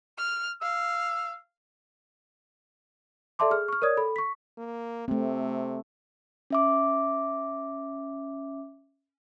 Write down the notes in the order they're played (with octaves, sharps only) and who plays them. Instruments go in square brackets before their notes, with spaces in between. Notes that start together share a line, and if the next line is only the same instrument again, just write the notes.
[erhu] F6
[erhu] F5 [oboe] E6
[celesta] A4 D5 E5 A5 C6 D6
G#4 F6
C#6 F6
A#4 C#5 D5 D#6 G#6
A4 B5
C#6 B6
[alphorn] A#3
[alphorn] C3 [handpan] A3 C4
[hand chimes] C#4 E5 D6